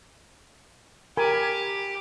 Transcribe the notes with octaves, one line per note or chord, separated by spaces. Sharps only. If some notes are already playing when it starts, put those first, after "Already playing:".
G4 A#4 G#5 B5